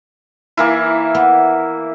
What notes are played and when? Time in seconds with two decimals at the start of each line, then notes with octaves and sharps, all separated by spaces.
0.57 E3 A#3 E4
1.15 B3